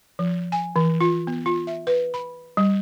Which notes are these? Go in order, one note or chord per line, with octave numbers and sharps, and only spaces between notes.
F3
G#5
E3
F4
B3
F4
E5
B4
B5
G3